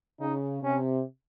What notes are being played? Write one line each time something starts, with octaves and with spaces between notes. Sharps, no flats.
C#3 D#4
C3 C#4